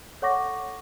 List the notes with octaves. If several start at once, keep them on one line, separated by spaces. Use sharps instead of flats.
A4 C#5 F#5 C#6 D6 A#6